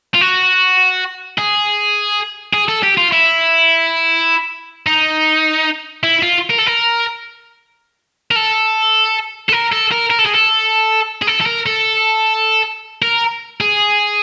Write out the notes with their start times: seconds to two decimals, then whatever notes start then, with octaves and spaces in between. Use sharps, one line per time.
0.14 F4
0.21 F#4
1.38 G#4
2.53 G#4
2.68 A4
2.83 G4
2.97 F4
3.12 E4
4.87 D#4
6.03 E4
6.23 F4
6.50 A#4
6.58 A4
6.66 A#4
8.31 A#4
8.36 A4
9.49 A4
9.52 A#4
9.72 A4
9.92 A#4
10.10 A#4
10.19 A4
10.26 G#4
10.35 A4
11.22 G#4
11.28 A4
11.41 A4
11.46 A#4
11.66 A4
13.02 A#4
13.61 G#4